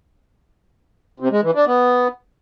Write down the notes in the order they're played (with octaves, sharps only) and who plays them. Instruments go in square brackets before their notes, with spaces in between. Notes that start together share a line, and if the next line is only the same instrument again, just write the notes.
[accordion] C3
G#3
E3
D4
B3